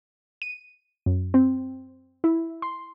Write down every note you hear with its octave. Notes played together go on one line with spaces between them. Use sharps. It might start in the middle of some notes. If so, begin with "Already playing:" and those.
D#7
F#2
C4
E4
C6